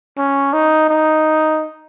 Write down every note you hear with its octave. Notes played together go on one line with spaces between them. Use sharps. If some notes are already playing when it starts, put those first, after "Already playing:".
C#4
D#4
D#4